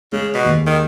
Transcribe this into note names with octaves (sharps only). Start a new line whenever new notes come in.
C#3 G#3
B2
D#2
D#3